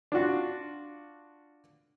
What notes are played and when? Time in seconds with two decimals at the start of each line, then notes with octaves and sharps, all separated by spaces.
0.12 D4 F4 F#4